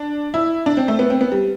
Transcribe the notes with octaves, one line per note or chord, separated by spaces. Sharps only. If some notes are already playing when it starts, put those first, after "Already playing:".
Already playing: D4
E4
D4
C4
A3
B3
C4
B3
G3